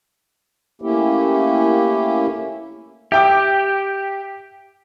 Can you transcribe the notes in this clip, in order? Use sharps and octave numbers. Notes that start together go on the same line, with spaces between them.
A3 A#3 C#4 E4 G4
G4 E5 G5 D6